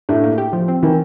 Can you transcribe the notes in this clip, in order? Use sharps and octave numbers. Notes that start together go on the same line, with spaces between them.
A2 A3 D4
A#3
G4
F3
C4
D#3 E3